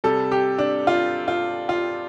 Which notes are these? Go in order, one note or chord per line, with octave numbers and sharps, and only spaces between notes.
C3 G3 A4
G4
D4
F4
F4
F4